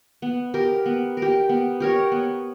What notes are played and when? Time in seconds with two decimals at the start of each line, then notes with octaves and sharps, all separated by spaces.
0.22 B3
0.54 G4 A#4
0.86 B3
1.17 A#4
1.22 G4
1.49 B3
1.80 G4 A#4 C#5
2.12 B3